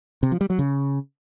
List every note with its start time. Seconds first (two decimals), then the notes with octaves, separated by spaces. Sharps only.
0.23 C3
0.32 F3
0.41 G3
0.50 F#3
0.59 C#3